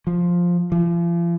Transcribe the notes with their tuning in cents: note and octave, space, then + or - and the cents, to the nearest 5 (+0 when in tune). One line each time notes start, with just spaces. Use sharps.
F3 +5
F3 -40